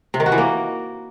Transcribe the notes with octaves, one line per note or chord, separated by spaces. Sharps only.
C3
D#3
F#4
E3
A#3